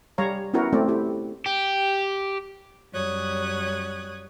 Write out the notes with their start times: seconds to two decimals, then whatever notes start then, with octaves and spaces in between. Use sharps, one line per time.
0.18 G3 C#5 F5 A#5
0.53 B3 C#4 E4 F#4 A#4
0.73 A3 C4 D5
0.88 E4 G4
1.46 G4
2.92 F#2 G3 C#5 D#6 F#6 G#6